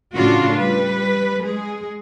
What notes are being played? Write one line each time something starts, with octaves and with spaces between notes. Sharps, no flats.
A2 C#3 D4 F4 F#4
G3 B4
G#3 G#4